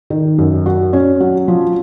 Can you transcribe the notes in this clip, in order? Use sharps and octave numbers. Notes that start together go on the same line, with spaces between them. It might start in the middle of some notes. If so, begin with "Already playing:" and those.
D#3
F#2
F#4
C#4
F#3
F3